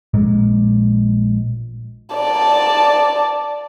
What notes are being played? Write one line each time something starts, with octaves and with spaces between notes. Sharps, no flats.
A#1 A#2 G#3
D5 A5